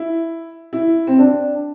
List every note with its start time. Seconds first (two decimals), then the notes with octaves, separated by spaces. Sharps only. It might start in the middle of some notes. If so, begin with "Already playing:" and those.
Already playing: E4
0.73 E4
1.07 C4
1.19 D4